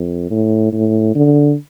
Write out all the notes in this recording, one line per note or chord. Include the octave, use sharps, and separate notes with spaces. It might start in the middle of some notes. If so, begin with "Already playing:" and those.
Already playing: F2
A2
A2
D3